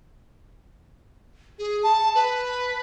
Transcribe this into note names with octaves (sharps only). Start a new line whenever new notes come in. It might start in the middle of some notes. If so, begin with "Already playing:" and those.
G#4
A5
B4